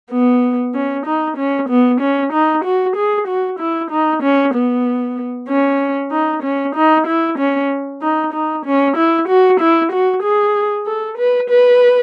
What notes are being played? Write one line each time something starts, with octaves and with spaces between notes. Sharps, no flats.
B3
C#4
D#4
C#4
B3
C#4
D#4
F#4
G#4
F#4
E4
D#4
C#4
B3
C#4
D#4
C#4
D#4
E4
C#4
D#4
D#4
C#4
E4
F#4
E4
F#4
G#4
A4
B4
B4